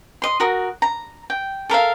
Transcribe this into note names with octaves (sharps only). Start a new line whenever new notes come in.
D#5 C6
F#4 A#4 D#6
A#5
G5
A4 A#4 E5 F5